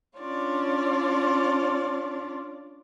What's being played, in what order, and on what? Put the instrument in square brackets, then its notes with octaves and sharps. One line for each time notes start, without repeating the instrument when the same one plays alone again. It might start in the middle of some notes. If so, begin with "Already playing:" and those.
[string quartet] C#4 D4 F4 C#5 D5